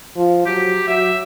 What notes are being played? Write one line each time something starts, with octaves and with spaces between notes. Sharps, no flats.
F3
F#3 G4
F#3 E5